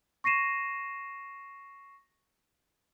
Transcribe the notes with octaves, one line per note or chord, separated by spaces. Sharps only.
C#6 A#6 C7 D#7 E7